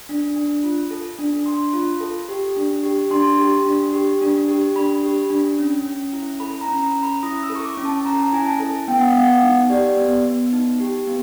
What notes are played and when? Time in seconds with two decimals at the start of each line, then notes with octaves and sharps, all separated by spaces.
0.09 D4
0.36 D4
0.64 F4
0.91 A4
1.19 D4
1.46 D4 C6
1.73 F4
2.00 A4
2.29 G4
2.57 D4
2.83 G4
3.10 D4 C6
3.38 G4
3.66 D4
3.93 G4
4.21 D4
4.48 G4
4.75 D4 B5
5.03 G4
5.30 D4
5.59 C#4
5.85 C#4
6.13 E4
6.40 A4 B5
6.61 A#5
6.69 C#4
6.81 A#5
6.95 C#4
7.03 B5
7.23 E4 D#6
7.43 E6
7.50 A4
7.55 C#6
7.65 D6
7.77 C#4
7.85 A5
8.05 C#4 A#5
8.20 A5
8.33 E4 G#5
8.47 A5
8.60 A4
8.88 B3 G5
8.99 F#5
9.09 F5
9.16 B3 F#5
9.43 D#4
9.70 G4 D5
9.97 B3
10.25 B3
10.53 D#4
10.80 G4
11.07 B3